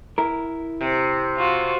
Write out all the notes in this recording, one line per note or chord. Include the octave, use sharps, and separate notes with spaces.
E4 A#4
C3
F4 F#4